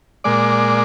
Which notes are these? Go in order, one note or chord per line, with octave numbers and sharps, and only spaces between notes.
A#2 G#3 D5